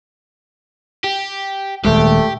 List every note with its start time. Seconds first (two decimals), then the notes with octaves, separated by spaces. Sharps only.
1.04 G4
1.85 D#1 G#3 A3 G4